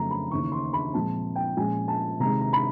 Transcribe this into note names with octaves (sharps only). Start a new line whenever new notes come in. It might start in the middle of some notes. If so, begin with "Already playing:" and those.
Already playing: F2 C#3 F#3 A3 A#5
B5
D#2 C#3 E3 C#6
C6
B5
A#2 F3 G#3 C4 A5
G5
A#2 F3 G#3 C#4 G#5
A5
C3 D#3 G#3 A#5
A#5
B5